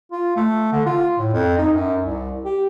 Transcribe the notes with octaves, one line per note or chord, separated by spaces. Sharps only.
F4
A3
D3
F4
A2
F2
D#4
F#2
C2
G4